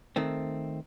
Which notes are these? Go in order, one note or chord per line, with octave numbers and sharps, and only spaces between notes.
D#3 A3 C4